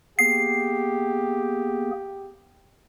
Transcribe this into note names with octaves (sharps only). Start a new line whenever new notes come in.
A#3 B3 G4 G#4 C7